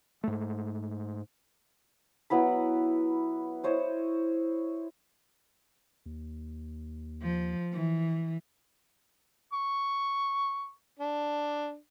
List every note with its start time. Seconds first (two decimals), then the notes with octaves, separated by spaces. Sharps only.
0.24 G#2 A3
2.30 F#3 B3 E4 B5
3.64 E4 C5 C#5 D#5
6.06 D#2
7.22 F3
7.72 E3
9.53 C#6
10.99 D4